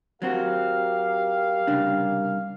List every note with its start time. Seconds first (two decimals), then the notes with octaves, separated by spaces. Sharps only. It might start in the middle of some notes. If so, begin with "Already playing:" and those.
0.22 F#3 C4 F#4 G4 A#4 F5
1.67 C2 C#3 D4